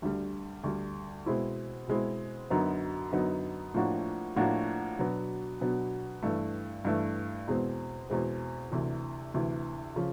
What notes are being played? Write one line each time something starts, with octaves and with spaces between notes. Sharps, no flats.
D2 D3 G3
D2 D3 G3
B2 G#3 C4 E4
B2 G#3 C4 E4
F#2 D3 F#3 B3 D#4
F#2 D3 F#3 B3 D#4
A2 F3 A#3 D4 F#4
A2 F3 A#3 D4 F#4
B2 F#3 B3 D4
B2 F#3 B3 D4
G2 E3 A3
G2 E3 A3
E2 B2 G#3 C4
E2 B2 G#3 C4
D2 C3 E3
D2 C3 E3
C#3 F3